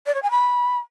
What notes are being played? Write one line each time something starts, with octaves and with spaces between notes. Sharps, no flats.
D5
C#5
G#5
B5